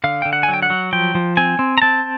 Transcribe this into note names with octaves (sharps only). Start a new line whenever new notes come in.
D3 F5
D3 G5
F#5
G#5
F#3
G5
F#5
F#3
F3 G5
F3
C4 G#5
C4
A#5
C4 A5